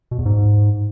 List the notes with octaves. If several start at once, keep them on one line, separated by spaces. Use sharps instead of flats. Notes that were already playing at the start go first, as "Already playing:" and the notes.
B2
E2
G#2